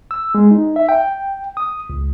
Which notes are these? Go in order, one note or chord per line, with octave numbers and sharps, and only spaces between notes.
E6
G#3
D#4
E5
G5
D#6
C#2